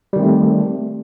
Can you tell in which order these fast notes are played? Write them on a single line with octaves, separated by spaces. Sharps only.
G3 D#3 C4 A3